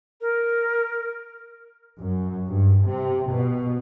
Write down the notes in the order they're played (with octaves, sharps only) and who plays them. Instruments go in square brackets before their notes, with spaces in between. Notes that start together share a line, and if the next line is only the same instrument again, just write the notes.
[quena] A#4
[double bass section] F#2
G2
C3
B2